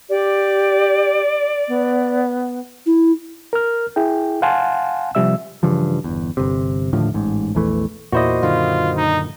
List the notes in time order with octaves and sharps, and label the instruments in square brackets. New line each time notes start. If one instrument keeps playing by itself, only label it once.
[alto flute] G4 [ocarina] D5
[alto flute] B3
[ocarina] E4
[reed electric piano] A#4 F6
E4 G#4 G5
F5 F#5 G#5 A5 C6
C3 F3 G3 E5 E6
[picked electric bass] G2 C#3 E3 F3
G1 E2
G1 C3
D#2 A2 D3 F3
A1 G#2
A#1 E2 E3 A3
[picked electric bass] E2 [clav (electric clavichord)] A#2 E4 D5 [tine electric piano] F#4 C5 D#5
[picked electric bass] F#2 D3 D#3 [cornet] F4
[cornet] D#4